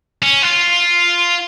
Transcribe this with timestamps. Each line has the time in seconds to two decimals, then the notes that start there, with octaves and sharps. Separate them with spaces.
0.23 C#4
0.43 F4